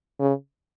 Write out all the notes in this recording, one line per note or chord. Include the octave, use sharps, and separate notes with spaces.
C#3